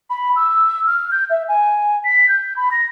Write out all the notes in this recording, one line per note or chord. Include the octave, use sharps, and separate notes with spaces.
B5
E6
F6
G6
E5
G#5
B6
G6
B5
A#6